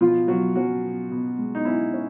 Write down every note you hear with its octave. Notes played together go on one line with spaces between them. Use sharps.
B2 F3 F4
B2 F#3 F#4
F#3 C#4 F#4
B2
B2
G#3
D#4
C#4 E4
C#4